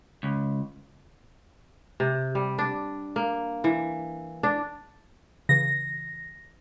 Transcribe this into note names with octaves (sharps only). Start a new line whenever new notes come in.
C#2
C3
G3
D4
A#3
E3
D4
C#3 E3 A#6